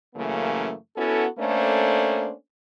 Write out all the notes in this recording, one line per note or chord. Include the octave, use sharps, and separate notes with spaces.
F#2 C#3 E3 A3 A#3
B3 C#4 E4 F#4 A4
A3 A#3 C#4 D4 A4 C5